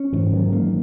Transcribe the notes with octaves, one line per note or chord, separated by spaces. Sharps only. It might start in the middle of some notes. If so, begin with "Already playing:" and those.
Already playing: C#4
G#2 E3
D#3 F#3
A#3